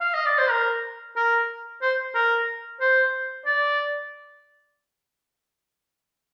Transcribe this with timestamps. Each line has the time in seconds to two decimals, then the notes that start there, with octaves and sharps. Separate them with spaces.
0.01 F5
0.14 D#5
0.25 D5
0.38 C5
0.50 A#4
1.16 A#4
1.82 C5
2.15 A#4
2.80 C5
3.46 D5